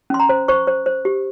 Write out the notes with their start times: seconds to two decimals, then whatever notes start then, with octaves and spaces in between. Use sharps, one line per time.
0.10 C#4 C6
0.20 A#5
0.29 C5
0.48 C5 C#6
0.67 C5
0.86 C5
1.05 G4